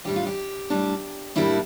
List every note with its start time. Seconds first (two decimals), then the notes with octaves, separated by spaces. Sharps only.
0.05 A2 G3 D4 G4
0.16 F4
0.27 G4
0.70 A2 G3 D4
1.36 A2 G3 A#3 D4 E4